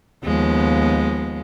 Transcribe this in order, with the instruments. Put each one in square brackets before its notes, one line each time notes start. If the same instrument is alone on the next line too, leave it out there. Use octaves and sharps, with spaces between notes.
[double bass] D#2 [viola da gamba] F3 G#3 B3